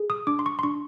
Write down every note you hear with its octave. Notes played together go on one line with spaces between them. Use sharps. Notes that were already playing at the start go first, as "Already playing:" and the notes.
Already playing: G#4
D#6
D4 D6
C6
C#6
C6
D4 C#6